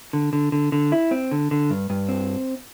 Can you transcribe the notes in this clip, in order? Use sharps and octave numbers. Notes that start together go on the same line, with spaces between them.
D3
D3
D3
D3
E4
C4
D3
D3
G2
G2
C4